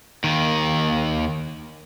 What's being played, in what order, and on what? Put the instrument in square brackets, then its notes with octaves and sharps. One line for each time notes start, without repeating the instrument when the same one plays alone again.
[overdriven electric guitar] D#2 D#3